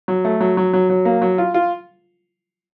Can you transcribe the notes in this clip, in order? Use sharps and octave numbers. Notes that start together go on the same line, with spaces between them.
F#3
A3
F#3
F#3
F#3
F#3
A#3
F#3
F4
F4